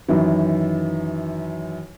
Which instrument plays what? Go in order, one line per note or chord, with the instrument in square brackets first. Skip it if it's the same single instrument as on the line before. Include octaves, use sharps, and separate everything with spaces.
[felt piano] F#2 D#3 E3